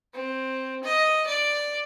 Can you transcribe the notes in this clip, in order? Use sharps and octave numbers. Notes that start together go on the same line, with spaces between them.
C4
D#5
D5